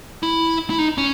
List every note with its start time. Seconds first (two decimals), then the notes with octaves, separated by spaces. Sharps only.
0.23 E4
0.70 E4
0.79 D#4
0.98 C#4